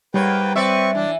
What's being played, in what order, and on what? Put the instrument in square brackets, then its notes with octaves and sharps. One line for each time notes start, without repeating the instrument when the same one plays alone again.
[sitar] G#2 A#3 C#5 [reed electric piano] G3 [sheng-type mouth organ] B4 G5
[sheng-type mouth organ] C4 C#6 [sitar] B4 D5 E5
[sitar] E3 [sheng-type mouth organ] D4